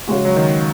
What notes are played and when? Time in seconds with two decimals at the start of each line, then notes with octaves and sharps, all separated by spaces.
0.07 C#3 G#3 F#4
0.25 F#3
0.36 D#3